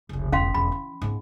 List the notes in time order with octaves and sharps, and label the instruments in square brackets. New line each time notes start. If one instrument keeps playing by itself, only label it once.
[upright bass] F1 C#2
[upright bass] E1 [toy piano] C#4 F5 C6
[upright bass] E1 [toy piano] B5
[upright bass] E3
G#2 B3